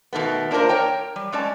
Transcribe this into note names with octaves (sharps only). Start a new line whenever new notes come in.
B2 D#3 A3 B3
A#3 D4 F4 G#4 A#4 C5
A#4 C#5 G5 A#5
G3
G#3 C#4 D5 A5